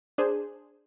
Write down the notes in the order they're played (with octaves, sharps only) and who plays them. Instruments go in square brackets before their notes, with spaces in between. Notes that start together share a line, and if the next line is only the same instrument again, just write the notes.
[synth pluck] D4 G#4 C5